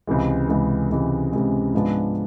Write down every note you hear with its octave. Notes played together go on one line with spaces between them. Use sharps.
C#2 C3 E3 G#3
C#2 C3 E3 G#3
C#2 C3 E3 G#3
C#2 C3 E3 G#3
G#2 F3 G#3 B3 D4